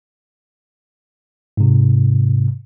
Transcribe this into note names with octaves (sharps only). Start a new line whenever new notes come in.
G#2 C3